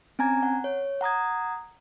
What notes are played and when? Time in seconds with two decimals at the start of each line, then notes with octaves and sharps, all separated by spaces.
0.19 C4 C#4 G#5 A#5 G#6
0.43 F#5
0.64 C#5
1.01 F#5 A#5 D#6 G#6